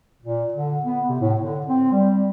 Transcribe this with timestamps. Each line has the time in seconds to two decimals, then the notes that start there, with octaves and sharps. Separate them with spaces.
0.22 A#2
0.53 D3
0.83 B3
1.08 C3
1.20 A2
1.40 D3
1.66 C4
1.92 G3